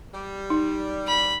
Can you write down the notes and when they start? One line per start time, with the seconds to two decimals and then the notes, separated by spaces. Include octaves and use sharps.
0.14 G3
0.50 D#4
1.07 B5